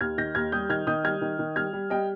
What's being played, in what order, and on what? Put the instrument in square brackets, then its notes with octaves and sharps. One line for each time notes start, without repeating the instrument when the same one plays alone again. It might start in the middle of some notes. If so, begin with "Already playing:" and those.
[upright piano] D#2 F6 G#6
D#3 G6 A#6
D#2 F6 G#6
G3 D#6 G6
D#3 F6 G#6
D#3 D#6 G6
G3 F6 G#6
D#3
D#3
G3 F6 G#6
G3
G3 D#5 G5